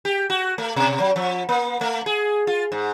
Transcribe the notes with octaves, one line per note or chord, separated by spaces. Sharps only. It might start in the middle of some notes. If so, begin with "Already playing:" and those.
G4
F#4
A3
B2
F#3
F3
A#3
A3
G#4
F4
G#2